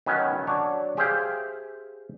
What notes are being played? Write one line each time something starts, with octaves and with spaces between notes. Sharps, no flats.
D#3 F#3 B3 C#4
F#3 D4 C#5
G4 G#4 C5 E5 F5 G5